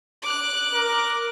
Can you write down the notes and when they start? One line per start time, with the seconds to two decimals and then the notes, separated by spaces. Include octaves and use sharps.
0.22 D6 F#6
0.74 A#4